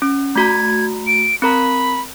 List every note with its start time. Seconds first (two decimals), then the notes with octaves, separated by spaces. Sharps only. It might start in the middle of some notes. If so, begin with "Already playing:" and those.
0.02 C#4
0.35 A3 F#4 A#5 G#6
1.07 D7
1.42 C4 A#4 A#5 B5